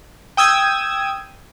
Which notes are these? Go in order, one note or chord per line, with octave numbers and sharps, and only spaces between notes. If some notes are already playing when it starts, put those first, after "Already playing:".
G5 D#6 E6 G#6